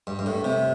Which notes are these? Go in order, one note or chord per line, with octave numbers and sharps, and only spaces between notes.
G2
G2
A2
C3